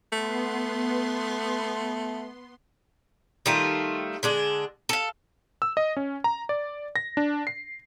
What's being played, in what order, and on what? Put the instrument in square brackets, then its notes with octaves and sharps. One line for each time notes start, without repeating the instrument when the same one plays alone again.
[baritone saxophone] A3 [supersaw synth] B3 C6
[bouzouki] D#3 G3 A3 F4
D3 G#3 D4
A4 F5
[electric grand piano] E6
D#5
C#4
A#5
D5
A#6
D4
C7